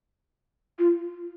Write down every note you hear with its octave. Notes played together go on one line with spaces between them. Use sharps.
F4